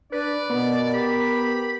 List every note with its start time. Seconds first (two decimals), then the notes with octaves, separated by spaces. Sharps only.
0.12 D4 B4 D5
0.50 B2 B3 A#4
0.94 G4 B5